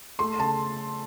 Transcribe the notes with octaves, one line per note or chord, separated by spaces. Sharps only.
A3 C6
C#3 A5